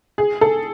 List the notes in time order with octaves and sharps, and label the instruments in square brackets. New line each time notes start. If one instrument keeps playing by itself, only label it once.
[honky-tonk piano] G#4
A4